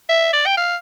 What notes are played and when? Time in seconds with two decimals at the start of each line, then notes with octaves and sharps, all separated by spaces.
0.09 E5
0.33 D5
0.46 G5
0.57 F5